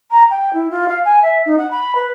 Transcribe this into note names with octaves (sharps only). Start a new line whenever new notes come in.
A#5
G5
E4
F4
F5
G#5
E5
D#4
F#5
B5
B4